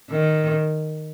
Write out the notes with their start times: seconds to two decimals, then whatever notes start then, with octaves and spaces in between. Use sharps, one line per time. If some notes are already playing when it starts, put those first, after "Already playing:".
0.10 D#3